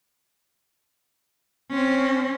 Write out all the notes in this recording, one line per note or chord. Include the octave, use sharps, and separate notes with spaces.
C4 C#4